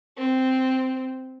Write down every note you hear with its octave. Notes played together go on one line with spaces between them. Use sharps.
C4